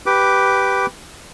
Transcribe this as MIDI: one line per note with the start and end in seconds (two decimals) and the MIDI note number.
0.06 0.86 67
0.06 0.86 71
0.06 0.86 86